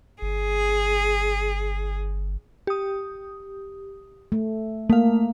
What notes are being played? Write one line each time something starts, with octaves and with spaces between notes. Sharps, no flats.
G1 G#4
G4 D#6
A3
A3 A#3 F5